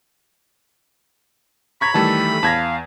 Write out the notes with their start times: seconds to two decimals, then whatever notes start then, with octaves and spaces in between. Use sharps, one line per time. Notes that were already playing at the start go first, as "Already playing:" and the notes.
1.81 A#5 B5 C#6 G#6 B6
1.94 D#3 E3 G3 A3 A4 A5
2.43 E2 F5 A5 G#6 A#6